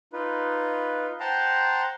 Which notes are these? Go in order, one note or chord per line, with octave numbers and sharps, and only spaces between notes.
D#4 F4 B4
C5 F#5 G5 A5 A#5 C6